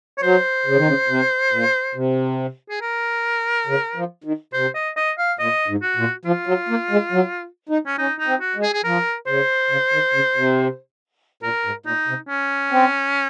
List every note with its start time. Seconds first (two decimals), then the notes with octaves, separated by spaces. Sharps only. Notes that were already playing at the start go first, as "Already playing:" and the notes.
0.18 C#5
0.23 F#3 C5
0.66 C#3
0.77 D#3
0.87 C#3
1.08 C3
1.51 A#2
1.95 C3
2.70 G#4
2.81 A#4
3.67 C#3
3.96 F3
4.24 D#3
4.53 C3 C5
4.75 D#5
4.96 D#5
5.18 F5
5.39 A#2 D#5
5.68 G#2
5.82 F#4
5.96 A#2
6.25 F3 F4
6.47 F#3
6.69 A#3
6.91 G#3
7.12 F#3
7.69 D#4
7.86 C#4
7.98 C#4 D#4
8.19 D#4
8.26 C4
8.41 F#4
8.56 G#3
8.63 G#4
8.74 G#4
8.84 F3 A#4
9.27 C#3 C5
9.70 C#3
9.92 D#3
10.14 C#3
10.35 C3
11.43 A#2 A#4
11.64 G#2
11.86 A#2 D#4
12.08 C3
12.29 C#4
12.72 C4